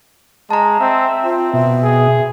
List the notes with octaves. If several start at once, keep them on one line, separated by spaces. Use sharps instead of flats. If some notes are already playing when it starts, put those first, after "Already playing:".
G#3 A5 A#5
C4 E5
C4 F4
B2 E5
G#4